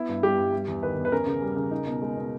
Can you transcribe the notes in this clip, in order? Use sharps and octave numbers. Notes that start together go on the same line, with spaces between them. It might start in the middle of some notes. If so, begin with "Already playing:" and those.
Already playing: B3 E4
G2
G3 G4
G2
G3
E2
D#3 B4
E2
B4
C#4 A#4
C#3
G3
C#3
D#4
B2
G#3
B2